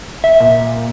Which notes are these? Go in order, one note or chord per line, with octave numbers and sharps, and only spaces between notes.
E5
A#2